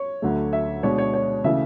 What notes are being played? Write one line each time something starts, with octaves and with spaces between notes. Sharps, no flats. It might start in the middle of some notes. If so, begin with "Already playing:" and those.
Already playing: C#5
D2 D3 F#3 A3
E5
B2 G#3 D4 C#5
C#5
C#5
C#3 E3 A3 E5